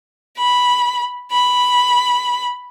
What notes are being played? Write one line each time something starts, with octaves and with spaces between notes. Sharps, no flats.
B5
B5